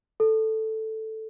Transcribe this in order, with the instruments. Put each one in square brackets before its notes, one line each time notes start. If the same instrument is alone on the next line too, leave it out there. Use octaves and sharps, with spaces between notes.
[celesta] A4